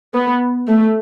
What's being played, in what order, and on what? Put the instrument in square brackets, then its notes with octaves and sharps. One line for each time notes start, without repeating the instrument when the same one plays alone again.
[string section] B3
A3